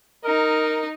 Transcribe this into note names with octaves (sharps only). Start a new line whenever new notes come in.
D#4 A#4